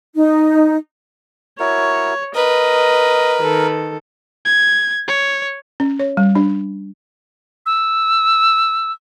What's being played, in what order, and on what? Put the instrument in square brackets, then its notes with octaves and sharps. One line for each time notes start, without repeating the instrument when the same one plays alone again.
[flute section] D#4
[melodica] E4 F#4 A#4 [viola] C#5
[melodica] A#4 [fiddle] B4 [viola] D#5
[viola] D#3 A4
[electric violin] G#6
C#5
[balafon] C#4
C#5
G3
D4
[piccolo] E6